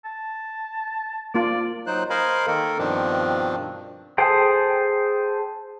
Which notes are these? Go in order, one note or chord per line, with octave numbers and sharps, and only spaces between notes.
A5
A#3 F4 D5
F#3 D#4 C5 F#6
A#4 C5 D#5 F5 G#5 B5
D#3 A#3 A4 A#4
G2 B2 D#3 F3 C4 D4
G#4 A4 C5 G5